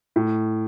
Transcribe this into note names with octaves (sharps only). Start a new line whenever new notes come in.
A2